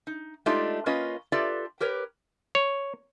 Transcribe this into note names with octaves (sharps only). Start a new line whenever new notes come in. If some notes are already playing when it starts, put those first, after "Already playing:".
D#4
G#3 A3 D4 D#4 F4 G4
A#3 C#4 F4 B4 D#5
F4 G4 A4 B4 D5 E5
G4 A#4 B4 C#5
C#5